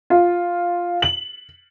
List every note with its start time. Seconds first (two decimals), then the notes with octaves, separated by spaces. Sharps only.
0.10 F4
1.02 F#7